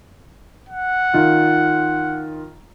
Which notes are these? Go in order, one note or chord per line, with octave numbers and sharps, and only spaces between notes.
F#5
D#3 F4